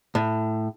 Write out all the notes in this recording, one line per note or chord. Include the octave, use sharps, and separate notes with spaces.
A2